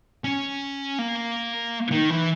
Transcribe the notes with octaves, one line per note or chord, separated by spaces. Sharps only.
C#4
A#3
D#3
E3